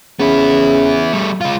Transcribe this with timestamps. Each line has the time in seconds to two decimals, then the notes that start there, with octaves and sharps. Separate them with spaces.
0.20 C#3 B3 E4
1.13 G3 A3
1.41 G#3 F4